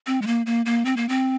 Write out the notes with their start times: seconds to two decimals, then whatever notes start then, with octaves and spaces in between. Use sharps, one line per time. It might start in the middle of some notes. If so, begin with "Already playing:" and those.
0.07 C4
0.22 G#3
0.27 A#3
0.46 A#3
0.66 A#3
0.85 C4
0.97 A#3
1.09 C4